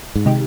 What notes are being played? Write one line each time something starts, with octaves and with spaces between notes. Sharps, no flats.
G#2
C3 D#3 G#3 D#4 G4